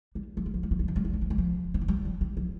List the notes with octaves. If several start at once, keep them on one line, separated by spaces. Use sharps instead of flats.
G3
F3
G3
F3
G3
F3
G3
F3
G3
F3
G3
F3
G3
F3
D#3
F3
G3
F3
G3
F3